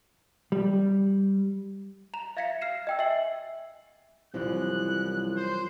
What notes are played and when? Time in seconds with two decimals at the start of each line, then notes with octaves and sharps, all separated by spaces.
0.52 G3
2.14 A#5 F7
2.37 E5 F5 G#6 A#6 B6 C#7
2.61 F6 C7 E7
2.87 D#5 G5 E6
2.99 E5 G#5 C7 F#7
4.34 C2 F#2 E3 F3 F#6
5.36 C5